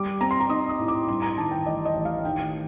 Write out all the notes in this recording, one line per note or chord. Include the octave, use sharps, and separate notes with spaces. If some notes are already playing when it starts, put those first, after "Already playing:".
Already playing: G3 D6
C4 A#5
C6
A#5
D#4 D#6
D#6
A2
D6
G2 C6
A#5
D#3 A5
G5
A1 D#5
D#5
A1
F5
D#3 G5